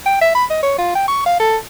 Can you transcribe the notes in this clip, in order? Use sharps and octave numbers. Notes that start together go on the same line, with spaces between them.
G5
E5
B5
D#5
C#5
F4
G5
C#6
F5
A4